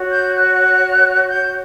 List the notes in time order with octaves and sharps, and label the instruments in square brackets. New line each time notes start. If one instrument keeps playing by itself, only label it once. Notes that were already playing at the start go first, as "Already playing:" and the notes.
Already playing: [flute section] F#4 C#5
G6
F#6
G6